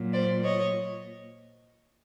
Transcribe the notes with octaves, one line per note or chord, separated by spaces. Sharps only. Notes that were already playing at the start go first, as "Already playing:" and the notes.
Already playing: A#2 F#3
C5 D5
C#5 D#5